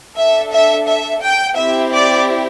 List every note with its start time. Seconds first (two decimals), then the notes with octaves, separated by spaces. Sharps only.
0.16 D4 A4 E5
0.51 E5
0.87 E5
1.22 G5
1.57 C4 E4 G4 E5
1.93 D5